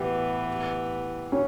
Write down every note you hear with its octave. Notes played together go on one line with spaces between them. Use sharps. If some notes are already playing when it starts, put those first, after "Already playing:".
Already playing: A2 E3 B3 G4
C#4